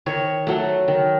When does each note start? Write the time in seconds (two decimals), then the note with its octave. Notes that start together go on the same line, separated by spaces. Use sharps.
0.06 D#3 C#5
0.47 F#3 A3
0.88 D#3